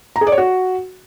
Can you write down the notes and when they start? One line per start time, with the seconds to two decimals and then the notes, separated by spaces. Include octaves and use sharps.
0.16 A#5
0.21 G#4
0.27 D5
0.32 C#5
0.38 F#4